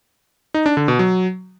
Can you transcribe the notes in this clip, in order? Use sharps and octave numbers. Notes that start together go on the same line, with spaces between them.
D#4
D4
D3
B2
F#3